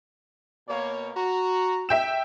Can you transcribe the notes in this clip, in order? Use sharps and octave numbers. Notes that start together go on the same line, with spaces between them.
B2 A#3 C#5
F#4 A#5
E5 G5 E7